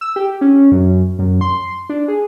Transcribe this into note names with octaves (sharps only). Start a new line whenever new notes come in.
E6
G4
C#4
F#2
F#2
C6
D4
G#4